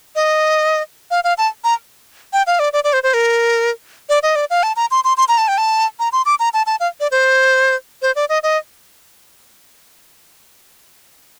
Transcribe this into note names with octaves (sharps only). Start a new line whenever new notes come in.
D#5
F5
F5
A5
A#5
G5
F5
D5
D5
D5
C5
C5
A#4
D5
D#5
D5
F5
A5
A#5
C6
C6
C6
A#5
A5
G5
A5
A#5
C6
D6
A#5
A5
A5
F5
D5
C5
C5
D5
D#5
D#5